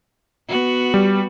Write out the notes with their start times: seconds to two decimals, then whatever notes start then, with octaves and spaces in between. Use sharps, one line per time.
0.49 B3 F#4
0.94 G3